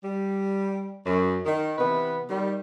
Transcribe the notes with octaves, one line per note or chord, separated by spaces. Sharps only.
G3
F#2
D#3
C3 E3 B3 B4
D#3 G3